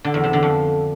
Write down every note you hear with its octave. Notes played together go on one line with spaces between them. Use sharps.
D3
E2
C3
D3
F2